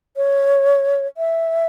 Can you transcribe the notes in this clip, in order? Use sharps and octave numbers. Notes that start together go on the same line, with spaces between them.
C#5
E5